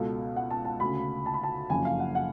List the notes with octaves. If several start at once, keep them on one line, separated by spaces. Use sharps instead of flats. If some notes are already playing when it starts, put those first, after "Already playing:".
Already playing: C#2 B2 A4
F#5
A5
A5
D2 C#3 B5
A5
B5
A5
F#1 F2 C#3 G#5
F5
F#5
F#5